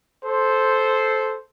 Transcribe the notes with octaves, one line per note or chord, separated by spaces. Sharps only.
A4 C5